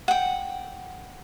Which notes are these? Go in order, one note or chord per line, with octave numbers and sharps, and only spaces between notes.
F#5 G5